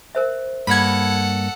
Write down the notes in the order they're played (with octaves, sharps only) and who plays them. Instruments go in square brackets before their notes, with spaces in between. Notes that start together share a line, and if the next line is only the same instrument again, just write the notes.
[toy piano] A#4 C5 E5
[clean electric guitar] G2 A#3 [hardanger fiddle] A4 F#5 [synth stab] B5 G#6